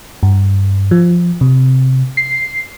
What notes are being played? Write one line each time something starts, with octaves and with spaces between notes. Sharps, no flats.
G2
F3
C3
C7